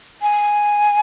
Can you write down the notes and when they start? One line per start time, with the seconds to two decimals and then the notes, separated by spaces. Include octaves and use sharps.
0.22 G#5